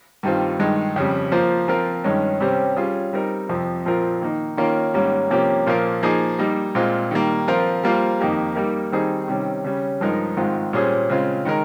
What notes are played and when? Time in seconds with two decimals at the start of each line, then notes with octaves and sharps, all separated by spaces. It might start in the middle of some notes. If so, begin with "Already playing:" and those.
0.23 G2 D#3 G3 C4 F4
0.59 G2 D#3 G#3
0.96 F2 C#3 G3
1.32 F3 A#3 F4 C5
1.68 F3 C4 F4 A#4
2.04 G2 D#3 G#3 C#4
2.40 C3 G3 C#4 G4 C5
2.76 G3 C#4 F4 G#4
3.13 G3 C4 D#4 A#4
3.49 F2 C3 F3
3.85 A#2 F3 C4 F4 A#4
4.22 D#3 A#3 D#4
4.57 D#3 A#3 C#4 F4 A#4
4.94 G#2 D#3 G3 A#3 C#4
5.30 C3 F3 A#3 C#4 G4
5.66 A#2 F3 A#3 F4 A#4
6.03 F3 A#3 D#4 G#4
6.39 G3 A#3 D#4
6.75 A#2 G#3 C4 F4
7.11 D#3 G3 A#3
7.48 F3 C4 F4 A#4
7.84 G3 A#3 F4 C5
8.20 F2 D#3 A#3 D#4 G4
8.56 G3 A#3 D#4 A#4
8.92 D#3 G3 C4 D#4 G#4
9.28 C3 D#3 G3 C#4
9.64 C#3 G3 C#4
10.01 G2 F3 G#3 D#4 A#4
10.37 G#2 D#3 G#3 C4 F4
10.73 A#2 G3 C#4 G#4 C5
11.10 C#3 G#3 C4 F4
11.45 D#3 G#3 D#4 A#4